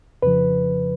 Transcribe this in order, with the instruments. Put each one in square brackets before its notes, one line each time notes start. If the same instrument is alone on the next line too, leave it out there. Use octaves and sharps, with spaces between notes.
[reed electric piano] F2 C#3 F3 B4